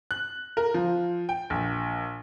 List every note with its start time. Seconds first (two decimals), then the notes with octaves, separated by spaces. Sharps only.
0.11 F#6
0.57 A#4
0.74 F3
1.29 G5
1.50 A#1